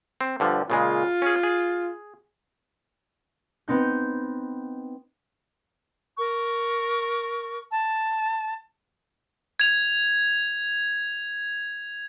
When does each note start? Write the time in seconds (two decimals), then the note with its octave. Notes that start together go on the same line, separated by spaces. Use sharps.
0.21 C4
0.40 G2 D3 F3
0.70 A#2 C#3 G#3 F4
1.22 C#4 G#4
1.43 G#4
3.68 B3 C4 D#4 G6
6.18 A#4 C#6
7.71 A5
9.60 G#6 F7